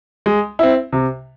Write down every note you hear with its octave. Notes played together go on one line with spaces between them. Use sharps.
G#3
C4 E4
C3